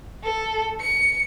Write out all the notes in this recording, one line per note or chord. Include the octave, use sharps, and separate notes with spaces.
A4
C#7